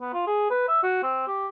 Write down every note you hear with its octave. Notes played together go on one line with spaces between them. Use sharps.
B3
F4
G#4
B4
E5
F#4
C4
G4